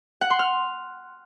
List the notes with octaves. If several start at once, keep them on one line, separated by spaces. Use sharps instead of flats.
F#5
C6
F6